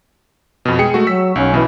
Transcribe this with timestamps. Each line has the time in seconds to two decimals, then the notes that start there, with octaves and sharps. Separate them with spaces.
0.65 F2 B2
0.79 G#3 G#4 G5 C#7
0.94 A3 F#4
1.07 F#3 E6 B6
1.36 B1 C#4
1.54 B2 E3